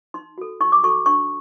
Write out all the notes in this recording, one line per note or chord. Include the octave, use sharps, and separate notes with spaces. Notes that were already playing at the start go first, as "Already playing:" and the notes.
D#4 C6
F#4 A4
D#4 C#6
D6
F#4 A4 C#6
D4 C#6